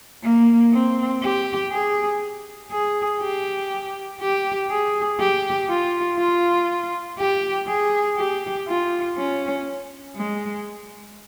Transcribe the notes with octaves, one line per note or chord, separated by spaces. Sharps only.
A#3
C4
G4
G#4
G#4
G4
G4
G#4
G4
F4
F4
G4
G#4
G4
F4
C#4
G#3